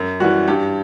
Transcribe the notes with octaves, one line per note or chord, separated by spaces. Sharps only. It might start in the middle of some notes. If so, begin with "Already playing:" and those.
Already playing: F#2
E3 G3 F#4
G2 G4